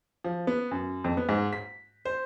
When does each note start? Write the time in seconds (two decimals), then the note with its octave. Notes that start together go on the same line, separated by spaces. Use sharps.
0.24 F3
0.47 B3
0.71 F#2
1.04 F2
1.17 B3
1.29 G#2
1.53 B6
2.05 C5